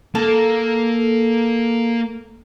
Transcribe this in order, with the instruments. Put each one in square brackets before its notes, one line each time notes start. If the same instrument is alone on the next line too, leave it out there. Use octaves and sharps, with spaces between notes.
[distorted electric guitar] A#3 [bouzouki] A4